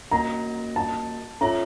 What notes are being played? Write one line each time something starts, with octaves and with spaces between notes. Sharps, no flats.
A#3 C#4 F#4 A#4 D#5 A#5
A5
C#4 F4 A4 C#5 E5 A#5